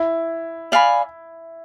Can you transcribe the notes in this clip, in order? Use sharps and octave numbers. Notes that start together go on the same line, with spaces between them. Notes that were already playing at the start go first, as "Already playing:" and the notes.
Already playing: E4
D5 F5 G#5 B5